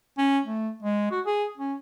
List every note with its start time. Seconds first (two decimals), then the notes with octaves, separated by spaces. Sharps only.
0.18 C#4
0.45 A3
0.83 G#3
1.11 F#4
1.26 G#4
1.58 C#4